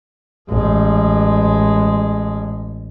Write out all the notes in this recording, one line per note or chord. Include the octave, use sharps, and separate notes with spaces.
A1 G#3